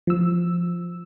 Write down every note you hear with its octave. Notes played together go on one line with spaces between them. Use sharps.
F3 E6